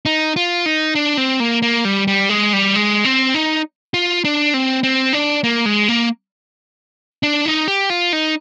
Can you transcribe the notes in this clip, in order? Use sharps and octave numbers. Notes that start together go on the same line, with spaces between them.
D#4
F4
D#4
D4
C4
A#3
A#3
G3
G3
G#3
G3
G#3
C4
D#4
F4
D4
C4
C4
D4
A#3
G#3
A#3
D4
D#4
G4
F4
D#4